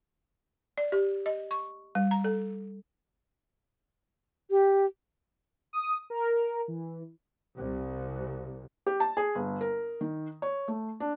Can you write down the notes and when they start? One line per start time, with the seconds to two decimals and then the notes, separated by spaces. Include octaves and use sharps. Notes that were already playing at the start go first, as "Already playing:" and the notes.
0.78 D5
0.92 G4
1.26 D#5
1.51 C#6
1.95 G3
2.11 A#5
2.24 A4
4.51 G4
5.73 D#6
6.10 A#4
6.68 E3
7.56 C2
8.86 G4
9.00 A5
9.17 G#4
9.35 G1
9.61 A#4
10.01 D#3
10.42 C#5
10.68 A3
11.00 D4